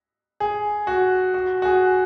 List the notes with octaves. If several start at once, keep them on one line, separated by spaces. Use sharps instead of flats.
G#4
F#4
F#4
F#4
G#4